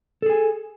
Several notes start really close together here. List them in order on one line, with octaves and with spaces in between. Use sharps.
A4 G#4 G#5